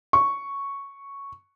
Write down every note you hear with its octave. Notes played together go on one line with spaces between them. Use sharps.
C#6